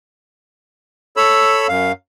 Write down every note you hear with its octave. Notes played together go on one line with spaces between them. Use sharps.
A4 C#5 B5 E6
F#2 F5